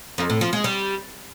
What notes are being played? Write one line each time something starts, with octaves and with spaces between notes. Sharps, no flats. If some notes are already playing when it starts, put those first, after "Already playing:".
F2
A2
F3
G#3
G3